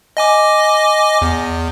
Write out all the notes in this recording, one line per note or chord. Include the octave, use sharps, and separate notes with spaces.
D#5 G#5 D6
E2